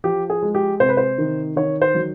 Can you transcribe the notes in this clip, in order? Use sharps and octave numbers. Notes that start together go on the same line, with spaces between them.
F3 G4
G#4
G#3
G4
C3 C5
B4
C5
D#3
D#3 C#5
C5
F#3